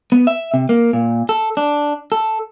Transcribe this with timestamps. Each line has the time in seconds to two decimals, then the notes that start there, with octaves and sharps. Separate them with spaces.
0.12 B3
0.27 E5
0.54 C3
0.69 A#3
0.93 A#2
1.29 A4
1.57 D4
2.12 A4